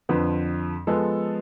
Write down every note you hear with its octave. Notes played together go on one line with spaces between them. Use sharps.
F2 D3 F3 B4
F3 G#3 B3 A4